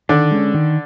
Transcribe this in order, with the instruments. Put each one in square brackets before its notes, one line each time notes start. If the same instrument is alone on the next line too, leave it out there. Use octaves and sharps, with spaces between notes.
[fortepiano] D3 D4 [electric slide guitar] D#3
[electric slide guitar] G#3 C#4
D#3